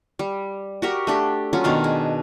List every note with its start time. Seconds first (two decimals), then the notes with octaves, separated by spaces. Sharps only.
0.19 G3
0.82 F#4 G4 A#4
1.07 A3 D4 G4
1.53 F#3 C#4 F4
1.64 B2 D#3 D4 F5
1.84 G#4